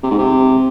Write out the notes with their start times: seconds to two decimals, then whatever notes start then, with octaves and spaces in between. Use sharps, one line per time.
0.03 C3
0.11 G#2
0.18 C3